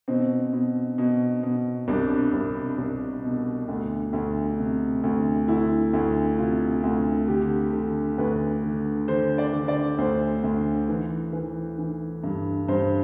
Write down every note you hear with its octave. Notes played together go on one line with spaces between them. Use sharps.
B2 C4
B2
B2
B2
C2 D4
C2
C2
B2
D2
D2
C3
D2
D2 E4
D2
C3 F4
D2
D3 G4
D3
D2 B4
D3
D3 C5
D5
D3
D5
D2 C5
D2
E3
E3
E3
G2
G2 C5